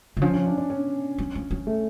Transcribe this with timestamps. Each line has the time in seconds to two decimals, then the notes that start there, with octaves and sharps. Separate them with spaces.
0.17 D3
0.22 F3 C#4
0.33 C#4
0.46 D4
0.58 D4
0.70 C#4
1.18 F#3
1.35 F3
1.51 F#3
1.67 A3